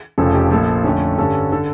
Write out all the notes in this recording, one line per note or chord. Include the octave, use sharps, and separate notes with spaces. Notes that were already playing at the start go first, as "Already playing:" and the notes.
F1 F2 C#3 F3 C#4 A4
G4
A#1 A#2 F3 A4
F2 D3 A3 C#4
G2 D3 G3 C#4 A4
D3 A4